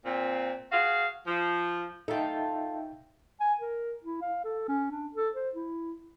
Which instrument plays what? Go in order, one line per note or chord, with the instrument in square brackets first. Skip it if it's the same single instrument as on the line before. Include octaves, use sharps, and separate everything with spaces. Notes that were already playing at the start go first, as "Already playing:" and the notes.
[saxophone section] A#2 C4
F#4 G#4 F5
F3
[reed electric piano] D#4 E5 G5 [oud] F4 A4
[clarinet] G#5
A#4
E4
F5
A4
C#4
D4
A4
C5
E4